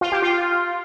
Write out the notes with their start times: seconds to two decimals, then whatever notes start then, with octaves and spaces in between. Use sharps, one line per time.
0.01 F4
0.12 G4
0.22 F4